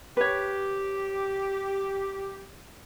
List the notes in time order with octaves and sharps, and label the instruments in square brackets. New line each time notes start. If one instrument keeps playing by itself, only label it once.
[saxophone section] G4 [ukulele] B4 C#5